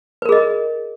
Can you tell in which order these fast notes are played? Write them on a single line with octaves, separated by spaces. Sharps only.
B4 A#4 G#4 D#5